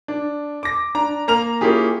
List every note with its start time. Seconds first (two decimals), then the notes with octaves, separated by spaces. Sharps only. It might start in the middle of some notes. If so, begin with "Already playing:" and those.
0.08 D4
0.63 D6 A#6
0.95 D4 A#5
1.28 A#3 A#5 F6 F7
1.61 A#3 C#4 E4 F4 G4 G#4